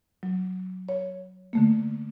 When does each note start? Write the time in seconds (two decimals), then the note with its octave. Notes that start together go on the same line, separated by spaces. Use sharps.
0.23 F#3
0.89 C#5
1.53 D3 A3 A#3